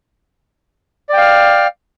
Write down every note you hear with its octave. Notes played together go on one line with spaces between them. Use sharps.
D5 F5 G5 F6